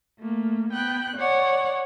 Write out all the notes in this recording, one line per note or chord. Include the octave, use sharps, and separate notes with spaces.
A3 A#3
B3 G5 F#6
C#5 D5 F#5